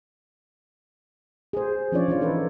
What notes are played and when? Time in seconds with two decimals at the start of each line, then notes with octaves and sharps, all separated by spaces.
1.53 G#4 C5
1.92 F3 C#4 D4 F4 C#5 D5
2.08 E3 F4 D5
2.21 D#4 A4 B4 C5